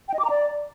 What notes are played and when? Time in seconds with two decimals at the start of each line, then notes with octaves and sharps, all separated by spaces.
0.08 G5
0.14 D#5
0.19 D6
0.25 A#5
0.30 D5